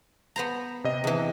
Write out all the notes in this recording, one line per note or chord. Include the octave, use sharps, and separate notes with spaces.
B3 C5 A#5
C3 D#5
E2 E3